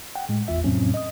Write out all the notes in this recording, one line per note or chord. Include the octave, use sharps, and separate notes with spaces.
F#5 G5
A2 G#3
G#1 E2 F4 E5
F2 A2 C3 F#3 C4 C#4
D#5 D#6